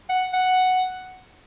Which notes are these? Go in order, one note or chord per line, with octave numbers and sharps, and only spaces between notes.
F#5
F#5